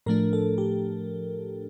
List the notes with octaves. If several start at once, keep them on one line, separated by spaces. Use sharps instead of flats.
A2 F3 A3 D4 A#4
A4
G4